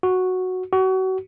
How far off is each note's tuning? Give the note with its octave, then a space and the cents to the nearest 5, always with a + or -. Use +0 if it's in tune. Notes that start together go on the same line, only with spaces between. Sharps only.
F#4 -5
F#4 +30